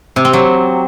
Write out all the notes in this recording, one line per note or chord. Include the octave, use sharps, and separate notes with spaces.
C3
C4
F#3